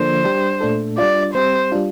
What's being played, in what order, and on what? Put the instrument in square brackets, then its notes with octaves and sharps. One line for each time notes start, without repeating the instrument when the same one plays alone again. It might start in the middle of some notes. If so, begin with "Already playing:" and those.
Already playing: [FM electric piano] D3 F3 A#3 D4 A4 [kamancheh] C5
[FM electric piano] G3 D4 G4
A#2 A3 D4 A4
[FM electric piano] G3 D4 F4 [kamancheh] D5
[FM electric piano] G3 C4 G4 [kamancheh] C5
[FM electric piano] G3 D4 F4